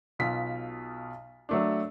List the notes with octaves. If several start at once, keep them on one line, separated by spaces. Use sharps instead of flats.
B1 B2 F4 B6
F#3 A3 D4